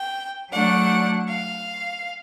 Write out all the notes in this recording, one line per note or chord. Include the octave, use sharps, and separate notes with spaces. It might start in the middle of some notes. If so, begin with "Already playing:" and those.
Already playing: G5
F#3 A3 D4 F#5
F5